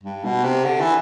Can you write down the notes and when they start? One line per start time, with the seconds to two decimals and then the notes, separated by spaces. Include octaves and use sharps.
0.04 G2
0.24 B2
0.44 C3
0.65 D3
0.80 E3